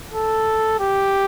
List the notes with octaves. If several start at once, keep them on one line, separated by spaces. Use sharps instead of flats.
A4
G4